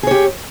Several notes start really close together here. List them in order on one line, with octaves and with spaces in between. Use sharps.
G#4 C#5 G4